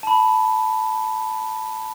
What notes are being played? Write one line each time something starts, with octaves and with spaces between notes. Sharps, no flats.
A5 B5